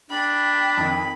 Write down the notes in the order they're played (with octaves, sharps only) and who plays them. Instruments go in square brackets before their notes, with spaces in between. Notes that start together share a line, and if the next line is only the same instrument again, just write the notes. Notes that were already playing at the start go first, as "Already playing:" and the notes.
[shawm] D4 [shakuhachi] G5 [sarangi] B5
[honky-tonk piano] F2 D#3